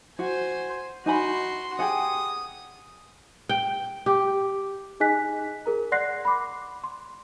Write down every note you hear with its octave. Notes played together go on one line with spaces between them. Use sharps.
F#4 C5 G#5
D#4 F#4 G#5 B5 C6
G4 G#4 F#5 D#6
G5
G4
D#4 G#4 D#5 G#5 F#6 B6
G#4 A#4 A#5
D5 F#5 C6 F#6 A#6 C7
B5 D6
C6